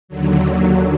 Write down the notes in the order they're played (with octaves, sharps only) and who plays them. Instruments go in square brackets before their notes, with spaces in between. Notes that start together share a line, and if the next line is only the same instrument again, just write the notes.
[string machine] D#2 D3 F#3